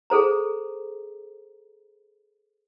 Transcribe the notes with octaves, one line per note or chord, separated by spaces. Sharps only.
G#4 A4 C5 A#5